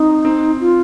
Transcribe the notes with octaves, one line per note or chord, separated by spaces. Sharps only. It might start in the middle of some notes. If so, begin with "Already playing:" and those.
Already playing: C4 D#4
C4
F4